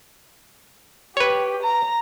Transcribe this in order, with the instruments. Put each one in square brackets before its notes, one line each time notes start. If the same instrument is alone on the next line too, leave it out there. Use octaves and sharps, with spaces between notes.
[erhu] G4 [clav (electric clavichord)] B4 C#5
[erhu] A#5